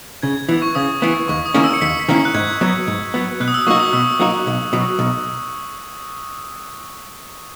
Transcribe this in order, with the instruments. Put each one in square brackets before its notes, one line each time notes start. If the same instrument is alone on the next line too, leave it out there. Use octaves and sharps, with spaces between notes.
[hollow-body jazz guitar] C#3 [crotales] G#6
[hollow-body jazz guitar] E3 B3
[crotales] C#6
[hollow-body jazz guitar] C#3 [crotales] D#6
[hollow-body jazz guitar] E3 B3
[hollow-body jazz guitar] D#2 [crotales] C#6
[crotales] D#6
[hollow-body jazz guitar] D#3 A#3 C#4 E4
[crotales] E6
C#7
[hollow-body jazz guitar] D#2 [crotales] B6
[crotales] B6
[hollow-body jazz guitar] D#3 A#3 C#4 E4
[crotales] F#6
[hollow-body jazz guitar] G#2 [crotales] G#6
[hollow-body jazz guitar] F#3 B3
G#2
F#3 B3
[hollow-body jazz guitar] B2 [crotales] F#6
[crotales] D#6
E6
D#6
[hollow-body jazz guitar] F#3 A#3 D#4 F#4 [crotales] C#6
[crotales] D#6
[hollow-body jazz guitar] B2 [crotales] E6
[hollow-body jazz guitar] F#3 A#3 D#4 F#4
B1
B2 F#3
B1